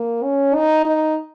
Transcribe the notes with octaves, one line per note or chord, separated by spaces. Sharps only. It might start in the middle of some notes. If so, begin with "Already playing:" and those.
Already playing: A#3
C#4
D#4
D#4